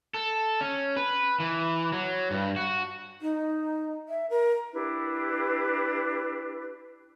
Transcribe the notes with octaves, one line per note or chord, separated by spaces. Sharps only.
A4
C#4
B4
E3
F#3
G2
F#4
D#4
E5
A#4
D4 E4 G4 B4